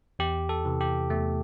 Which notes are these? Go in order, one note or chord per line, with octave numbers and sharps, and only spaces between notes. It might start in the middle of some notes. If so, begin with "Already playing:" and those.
E2 G4
A4
C3 E3
G4
E2 A3